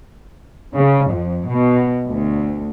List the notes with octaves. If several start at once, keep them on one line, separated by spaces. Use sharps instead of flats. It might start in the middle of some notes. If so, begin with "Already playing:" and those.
C#3
F2
B2
D2